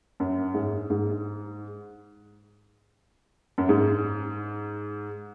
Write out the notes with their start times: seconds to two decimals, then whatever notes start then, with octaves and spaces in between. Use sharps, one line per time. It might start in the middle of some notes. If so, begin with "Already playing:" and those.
0.20 F#2
0.54 G#2
0.90 G#2
3.58 F#2
3.69 G#2